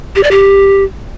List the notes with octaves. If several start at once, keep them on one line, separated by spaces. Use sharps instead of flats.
G4
D5
G4